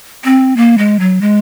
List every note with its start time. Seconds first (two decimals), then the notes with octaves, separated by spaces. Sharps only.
0.25 C4
0.57 A#3
0.78 G#3
1.00 F#3
1.21 G#3